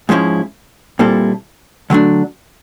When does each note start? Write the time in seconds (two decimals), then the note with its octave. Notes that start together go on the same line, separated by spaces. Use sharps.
0.09 G#2 F3 G#3 C#4 E4
0.99 A#2 G3 C4 E4 A4
1.90 D3 F#3 A3 D4